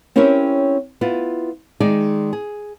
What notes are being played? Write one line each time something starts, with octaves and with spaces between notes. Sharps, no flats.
C4 C#4 E4 G4 A#4 C#5
B3 E4 F4
D#3 G#3 D#4 G#4 D5
G#4